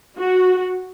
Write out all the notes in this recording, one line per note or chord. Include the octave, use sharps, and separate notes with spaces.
F#4